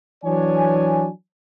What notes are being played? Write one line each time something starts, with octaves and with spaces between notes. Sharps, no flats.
E3 F#3 D4 C#5 G#5